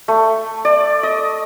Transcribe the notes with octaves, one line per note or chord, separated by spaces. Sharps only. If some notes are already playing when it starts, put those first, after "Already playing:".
A3
D5
D#5